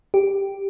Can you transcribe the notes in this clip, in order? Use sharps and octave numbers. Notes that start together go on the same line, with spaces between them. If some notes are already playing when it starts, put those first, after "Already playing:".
G4